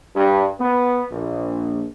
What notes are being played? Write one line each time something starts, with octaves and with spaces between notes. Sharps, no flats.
G2
B3
A#1